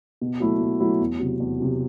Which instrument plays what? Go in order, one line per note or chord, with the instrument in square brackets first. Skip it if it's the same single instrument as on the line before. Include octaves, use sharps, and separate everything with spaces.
[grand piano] B2
F#3 A3 E4
B2
F#3 A3 E4
E2
C3 F#3
E2
C3 F#3